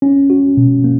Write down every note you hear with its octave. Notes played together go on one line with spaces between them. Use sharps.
C#4
F#4
B2
A#3